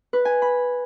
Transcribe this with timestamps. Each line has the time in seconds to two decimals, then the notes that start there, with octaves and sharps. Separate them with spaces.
0.13 B4
0.25 G#5
0.42 B5